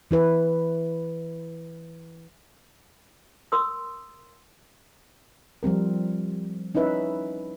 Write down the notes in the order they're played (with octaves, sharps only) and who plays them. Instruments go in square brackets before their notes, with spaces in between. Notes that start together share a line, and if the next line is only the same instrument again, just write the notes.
[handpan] E3 E4 B4
[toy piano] A#4 C6 D#6 E6
[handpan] F3 G3 C4 A#4
C#4 D#4 E4 B4 E5